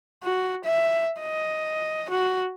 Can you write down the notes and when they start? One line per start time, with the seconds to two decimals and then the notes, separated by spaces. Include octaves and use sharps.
0.24 F#4
0.65 E5
1.21 D#5
2.10 F#4